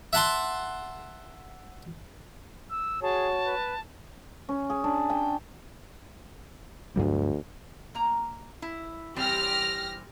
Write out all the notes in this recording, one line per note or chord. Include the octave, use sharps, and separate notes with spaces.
E5 F#5 A5 C6
E6
F#4 G#4 C#5 A5
B4
C#4
G#4
D4
G5
D2 G2 F#3 G3
A#3 A#5
E4
E3 G3 C4 G4 F6 A#6